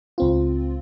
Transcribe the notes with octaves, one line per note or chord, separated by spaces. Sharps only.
C#2 C4 F4